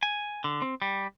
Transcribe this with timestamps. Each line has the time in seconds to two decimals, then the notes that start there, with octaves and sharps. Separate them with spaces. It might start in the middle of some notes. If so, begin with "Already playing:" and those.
0.03 G#5
0.44 D3
0.62 C4
0.82 G3